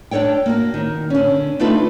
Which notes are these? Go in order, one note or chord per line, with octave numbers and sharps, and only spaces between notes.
D4 D#4 A4 C#5 G5
A#3 F#4
D#3
D3 C#4
A3 D4 D#4 F4 A4 B4